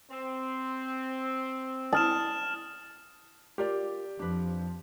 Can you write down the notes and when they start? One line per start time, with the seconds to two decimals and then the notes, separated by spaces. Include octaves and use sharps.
0.11 C4
1.93 A5 D#6 F6 E7
3.58 F4 G4 A#4 D5
4.19 F2 F3 D4 B4